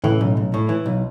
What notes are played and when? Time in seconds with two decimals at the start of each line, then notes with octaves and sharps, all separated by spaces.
0.04 A2 C#3 E3
0.21 B1
0.37 B1
0.54 A2
0.69 E3
0.86 B1